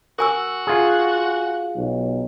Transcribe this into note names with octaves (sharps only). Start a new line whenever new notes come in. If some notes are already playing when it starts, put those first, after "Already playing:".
F#4 A#4 G#5 E6
F4 G#4
B1